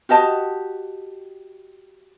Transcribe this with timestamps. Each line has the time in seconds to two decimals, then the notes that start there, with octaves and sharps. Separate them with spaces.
0.09 F#4 G4 D#5 A5